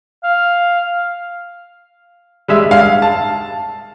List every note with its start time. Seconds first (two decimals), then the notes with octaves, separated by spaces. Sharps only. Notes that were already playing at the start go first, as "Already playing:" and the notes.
0.24 F5
2.48 G3 G#3 E5
2.71 F5
3.02 A5